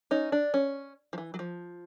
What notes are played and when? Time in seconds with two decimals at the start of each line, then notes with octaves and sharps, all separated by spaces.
0.11 C#4 D#4
0.32 D4
0.54 C#4
1.13 F3
1.18 E3
1.34 F#3
1.39 F3